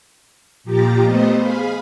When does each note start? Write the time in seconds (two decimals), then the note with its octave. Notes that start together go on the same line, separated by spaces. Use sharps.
0.64 A#2 F3 G4 A#5 A6
1.03 A3 B3 C5 D#5
1.38 G#4 F5 B5